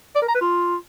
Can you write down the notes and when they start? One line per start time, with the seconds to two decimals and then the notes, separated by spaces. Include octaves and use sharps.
0.16 D5
0.22 A#4
0.28 A#5
0.35 B4
0.41 F4